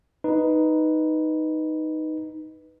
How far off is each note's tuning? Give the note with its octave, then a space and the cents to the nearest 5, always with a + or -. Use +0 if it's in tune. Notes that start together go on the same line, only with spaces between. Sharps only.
D#4 +0 B4 +0